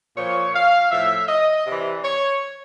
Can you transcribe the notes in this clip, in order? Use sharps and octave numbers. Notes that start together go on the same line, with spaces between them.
A#2 F3 C#5
F5
A2 F3 E5
D#5
C3 E3 D5
C#5